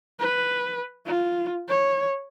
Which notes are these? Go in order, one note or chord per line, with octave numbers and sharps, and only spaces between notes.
B4
F4
C#5